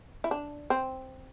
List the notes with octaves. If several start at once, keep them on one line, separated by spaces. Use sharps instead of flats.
E4
D4
C4